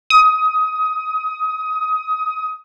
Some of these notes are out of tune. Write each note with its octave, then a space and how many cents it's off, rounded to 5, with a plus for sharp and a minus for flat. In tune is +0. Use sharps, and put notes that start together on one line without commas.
D#6 +20